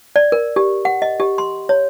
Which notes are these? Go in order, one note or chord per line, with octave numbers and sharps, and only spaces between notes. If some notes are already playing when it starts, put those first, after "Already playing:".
D5
A#4
G4
F#5
D#5
G4
C6
C#5